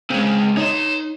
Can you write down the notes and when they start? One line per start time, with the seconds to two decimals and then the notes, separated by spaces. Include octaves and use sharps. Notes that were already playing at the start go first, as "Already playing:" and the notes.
0.10 C#3 G#3 C4
0.57 D#4 C#5 C6